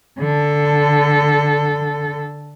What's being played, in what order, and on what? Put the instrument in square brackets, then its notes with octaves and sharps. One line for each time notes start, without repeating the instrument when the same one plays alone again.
[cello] D3 A4